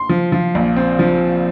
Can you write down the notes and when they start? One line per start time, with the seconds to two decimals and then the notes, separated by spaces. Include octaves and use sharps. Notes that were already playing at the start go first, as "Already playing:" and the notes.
Already playing: C6
0.09 F3
0.32 F3
0.55 A#1
0.76 C4
0.99 F3